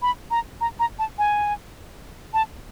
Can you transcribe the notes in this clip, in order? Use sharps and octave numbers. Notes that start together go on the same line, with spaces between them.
B5
A#5
A#5
A#5
A5
G#5
A5